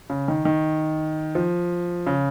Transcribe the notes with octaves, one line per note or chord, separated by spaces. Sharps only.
C#3
D#3
D#3
F3
C#3